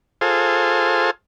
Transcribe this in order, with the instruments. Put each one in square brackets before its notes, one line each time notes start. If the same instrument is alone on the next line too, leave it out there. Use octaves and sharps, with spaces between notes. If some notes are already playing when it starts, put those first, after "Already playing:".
[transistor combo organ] F4 G#4 A4 C5